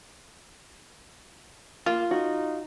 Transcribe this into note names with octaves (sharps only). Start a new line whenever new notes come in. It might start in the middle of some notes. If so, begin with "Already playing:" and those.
A#3 F4
D#4 F#4